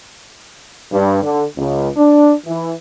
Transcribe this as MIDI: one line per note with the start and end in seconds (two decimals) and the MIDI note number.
0.92 1.18 43
1.22 1.44 50
1.58 1.88 37
1.97 2.33 62
2.46 2.73 52